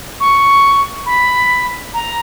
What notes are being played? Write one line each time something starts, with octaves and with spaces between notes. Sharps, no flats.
C#6
B5
A#5